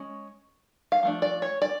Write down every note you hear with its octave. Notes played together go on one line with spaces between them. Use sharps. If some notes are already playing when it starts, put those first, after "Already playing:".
Already playing: G#3 C#4
F5
F3 A3 D4
D5
C#5
D5